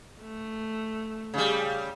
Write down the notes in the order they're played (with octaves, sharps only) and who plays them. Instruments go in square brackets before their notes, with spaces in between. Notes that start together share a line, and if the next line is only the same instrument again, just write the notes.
[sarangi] A3
[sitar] C#3 G3